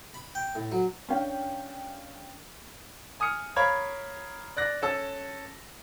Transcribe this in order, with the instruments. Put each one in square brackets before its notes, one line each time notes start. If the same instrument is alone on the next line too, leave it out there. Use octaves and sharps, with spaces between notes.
[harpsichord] B5
G5
A2
F#3
[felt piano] C#4 D4 A#4 F5 G5
[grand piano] G#5 D#6 F6 C#7
A#4 C#5 F5 B5 G#6
D5 F#6 A#6
C#4 A4 E6